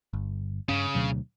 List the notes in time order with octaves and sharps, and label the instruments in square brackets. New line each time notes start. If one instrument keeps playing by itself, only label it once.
[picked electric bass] G1
[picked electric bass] G2 C#4 [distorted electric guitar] C#3
[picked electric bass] D2 B2 F#3